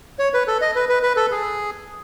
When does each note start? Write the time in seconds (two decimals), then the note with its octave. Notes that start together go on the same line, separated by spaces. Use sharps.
0.19 C#5
0.34 B4
0.48 A4
0.61 D#5
0.75 B4
0.89 B4
1.03 B4
1.17 A4
1.31 G#4